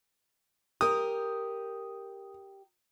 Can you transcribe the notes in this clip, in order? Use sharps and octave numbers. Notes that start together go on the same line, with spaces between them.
G4 A#4 D#6